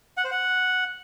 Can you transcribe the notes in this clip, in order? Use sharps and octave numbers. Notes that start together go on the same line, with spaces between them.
F#5
C5
F#5